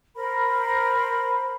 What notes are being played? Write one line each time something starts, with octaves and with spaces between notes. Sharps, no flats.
A#4 C5 B5